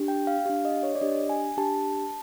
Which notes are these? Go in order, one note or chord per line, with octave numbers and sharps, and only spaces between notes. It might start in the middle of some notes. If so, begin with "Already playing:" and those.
Already playing: D4 G4
G5
F5
D4 G4 F5
D#5
C#5
D5
D4 G4 D#5
G#5
D4 G4 A5